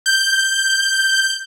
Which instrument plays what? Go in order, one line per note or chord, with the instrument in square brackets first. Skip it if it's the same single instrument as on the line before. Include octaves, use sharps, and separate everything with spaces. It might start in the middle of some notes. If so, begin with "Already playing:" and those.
[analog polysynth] G6